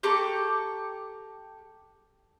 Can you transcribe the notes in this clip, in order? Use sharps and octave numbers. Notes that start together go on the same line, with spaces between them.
G4 A4 A#5 C#6